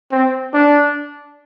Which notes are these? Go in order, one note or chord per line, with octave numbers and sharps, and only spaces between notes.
C4
D4